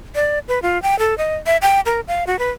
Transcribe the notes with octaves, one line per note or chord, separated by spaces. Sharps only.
D5
B4
F4
G5
A4
D#5
E5
G5
A#4
F5
F#4
B4